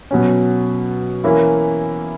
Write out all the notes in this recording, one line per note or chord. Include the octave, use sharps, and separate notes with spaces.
B2 F#3 C#4
E3 A#3 C#4 E4